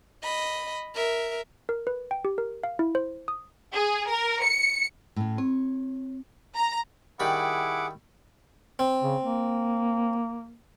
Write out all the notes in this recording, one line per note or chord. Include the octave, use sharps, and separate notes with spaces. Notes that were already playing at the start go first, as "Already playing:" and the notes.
D#5 B5
A#4 E5
A#4
B4
G5
G4
A#4
F5
E4
C5
D#6
G#4
A#4
C#7
A2 C#4
C4 C#5
A#5
D#3 G3 E4 G#4 F#5 B5 D6
C4
C#3
A#3